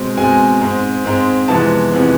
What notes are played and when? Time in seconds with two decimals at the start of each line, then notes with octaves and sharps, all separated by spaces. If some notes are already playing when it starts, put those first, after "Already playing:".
Already playing: B2 G#3 C4
0.17 B2 G#3 C4 G#5
0.61 G#2 G#3 C4
1.05 G#2 G#3 C4
1.48 F2 C3 E3 G#3 B3 A5
1.92 F2 C3 E3 G#3 B3